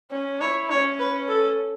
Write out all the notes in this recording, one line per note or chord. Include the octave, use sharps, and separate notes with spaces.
C#4
E4 C#5
C#4 C#5
B4
A4